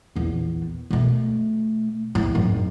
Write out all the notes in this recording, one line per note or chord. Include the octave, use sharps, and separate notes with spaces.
A#1 E2
B2 A3
E2 A2
G#1 F#2